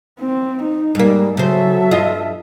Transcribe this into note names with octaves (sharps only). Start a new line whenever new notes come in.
C4
D#4
G#2 G3 A#3
C#3 F#3 A4 C5 E5
G2 F4 D#5